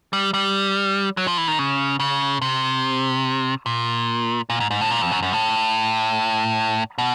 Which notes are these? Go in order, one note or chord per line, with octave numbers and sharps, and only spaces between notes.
G3
G3
F#3
F3
E3
D#3
C#3
C#3
C3
A#2
A#2
G#2
G#2
A2
A#2
F2
F#2
F#2
A2
B2